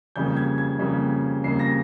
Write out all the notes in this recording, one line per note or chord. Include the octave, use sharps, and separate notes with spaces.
F2 C#3 G3 A#3 G6
G#6
G#6
F2 C#3 G3 A#3
F2 C#3 G3 A#3 C7
A#6